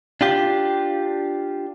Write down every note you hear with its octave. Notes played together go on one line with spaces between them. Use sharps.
D4 F4 G4